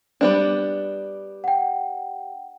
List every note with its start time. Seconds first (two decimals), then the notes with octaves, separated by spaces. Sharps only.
0.21 G3 B3 D4
1.44 F#5 G5